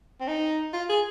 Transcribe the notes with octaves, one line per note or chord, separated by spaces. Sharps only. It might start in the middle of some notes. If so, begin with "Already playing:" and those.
C4
D#4
F4
G#4